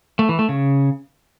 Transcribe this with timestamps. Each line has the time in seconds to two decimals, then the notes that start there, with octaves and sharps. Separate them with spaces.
0.19 A3
0.29 E3
0.39 A3
0.49 C#3